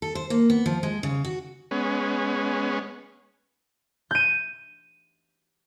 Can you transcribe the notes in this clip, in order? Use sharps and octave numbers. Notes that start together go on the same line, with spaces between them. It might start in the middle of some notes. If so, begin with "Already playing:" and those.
A4
C5
A#3
B3
F3
G#3
C#3
F#4
G#3 B3 C#4
G6 D#7